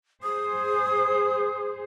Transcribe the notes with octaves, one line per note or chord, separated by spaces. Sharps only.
G#4 C5 D#6